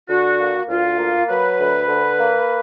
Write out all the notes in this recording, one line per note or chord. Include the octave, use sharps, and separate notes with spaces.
D3 F#4
A#3
D2 F4
A#3
F#3 B4
D2
D3
A#3